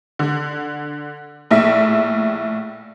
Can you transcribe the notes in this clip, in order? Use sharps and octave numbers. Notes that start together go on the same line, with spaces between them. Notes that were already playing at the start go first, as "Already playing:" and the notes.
D3
A#1 A2 E5